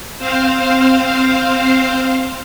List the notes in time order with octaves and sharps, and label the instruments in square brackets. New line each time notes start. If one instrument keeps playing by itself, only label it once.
[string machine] C4 C5 F5